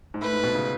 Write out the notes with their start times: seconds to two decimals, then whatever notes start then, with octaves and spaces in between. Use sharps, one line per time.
0.14 G#2
0.22 A2 B4
0.33 G#2
0.43 B2
0.55 C#3